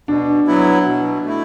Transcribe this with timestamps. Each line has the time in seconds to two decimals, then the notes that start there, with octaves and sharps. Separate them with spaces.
0.08 B2 D4
0.47 F#3 B3 E4
0.87 B2
1.26 A3 E4